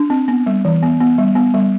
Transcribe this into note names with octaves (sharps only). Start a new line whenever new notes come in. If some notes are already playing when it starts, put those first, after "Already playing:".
Already playing: D4
C4
B3
G3
E3
B3
B3
G3
B3
G3